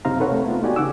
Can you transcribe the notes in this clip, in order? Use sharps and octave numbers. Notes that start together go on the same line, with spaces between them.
F#2 C3 D#4 C5 F5 A#5
A4 B4 C#5 F#5
A3 C4
B3 F4
A3 D#4 F#4 G4 D5 G#5
C#3 F#5 D6 E6